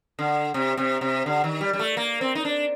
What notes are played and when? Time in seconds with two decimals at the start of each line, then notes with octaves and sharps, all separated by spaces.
0.19 D3
0.54 C3
0.77 C3
1.01 C3
1.26 D3
1.44 D#3
1.61 G3
1.73 G3
1.79 A3
1.97 A#3
2.21 C4
2.35 D#4
2.45 D4